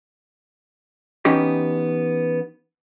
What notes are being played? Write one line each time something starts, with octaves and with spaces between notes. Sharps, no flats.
E3 B3 C#4 D#4 G4